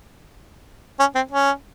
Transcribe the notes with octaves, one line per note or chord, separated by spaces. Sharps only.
C#4
C4
C#4